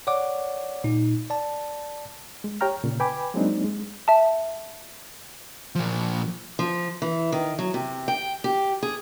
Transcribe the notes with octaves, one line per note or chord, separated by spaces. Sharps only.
C#5 D5 F#5 D6
A#2 D#4
D5 A5
G#3
G4 C#5 G5 A#5 F6
A#2 C#3
B4 G5 G#5 B5 D6
F#3 G#3 A#3 C4 D4 D#4
G#3
E5 A5
A#2 F3
F3
E3
D#3
F#3
C3
G5
G4
G#4